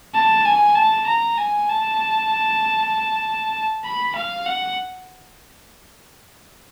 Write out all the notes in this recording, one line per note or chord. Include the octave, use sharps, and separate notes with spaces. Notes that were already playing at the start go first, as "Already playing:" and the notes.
A5
G#5
A5
A#5
G#5
A5
B5
F5
F#5